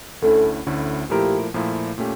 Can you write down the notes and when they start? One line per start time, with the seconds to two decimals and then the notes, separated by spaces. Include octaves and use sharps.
0.22 D2 D3 A3 C#4 E4 A4
0.67 D2 D3 A3 C#4 E4
1.10 A#2 F3 A3 E4 G4 A#4
1.54 A#2 F3 A3 E4 A#4
1.98 A#2 A3 C#4 G4